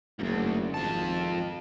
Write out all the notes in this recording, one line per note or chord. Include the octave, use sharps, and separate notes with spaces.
F#1 D2 G#2
G#1 F2 A5